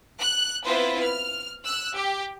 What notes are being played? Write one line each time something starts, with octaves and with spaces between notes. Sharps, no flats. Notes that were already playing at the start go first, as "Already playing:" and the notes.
F#6
B3 C4 E4 F4 B4 C5
F6
E6 F#6
G4